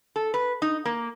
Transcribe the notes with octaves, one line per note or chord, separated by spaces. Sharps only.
A4
B4
D#4
A#3